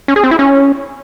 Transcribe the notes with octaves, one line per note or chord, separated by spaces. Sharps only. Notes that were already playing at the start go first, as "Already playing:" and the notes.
C#4
G#4
C4
E4
C#4